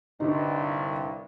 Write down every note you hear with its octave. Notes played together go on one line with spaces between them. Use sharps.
C2 G2 D3 D#4